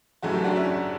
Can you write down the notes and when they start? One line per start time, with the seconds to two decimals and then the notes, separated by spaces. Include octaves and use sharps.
0.23 F#1 F#2 E3 A3 F#4
0.34 G4
0.44 D4 F#4
0.56 C#4 E4